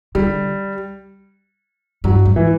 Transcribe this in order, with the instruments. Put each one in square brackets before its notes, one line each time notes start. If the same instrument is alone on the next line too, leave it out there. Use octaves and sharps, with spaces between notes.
[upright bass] D3 [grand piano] G3
[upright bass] G2 [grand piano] F#3
[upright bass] G#2
[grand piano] E3